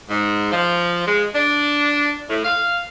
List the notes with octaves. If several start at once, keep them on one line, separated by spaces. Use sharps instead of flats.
G#2
F3
G#3
D4
A2
F5